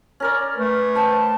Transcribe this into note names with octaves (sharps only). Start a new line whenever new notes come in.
C#4 A#4 D5
A3 B4
C5 G5 A5